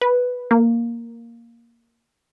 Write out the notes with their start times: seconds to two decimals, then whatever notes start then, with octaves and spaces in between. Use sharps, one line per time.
0.01 B4
0.51 A#3